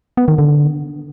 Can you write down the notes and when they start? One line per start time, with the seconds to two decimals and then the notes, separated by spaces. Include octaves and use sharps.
0.17 B3
0.28 D#3
0.38 D3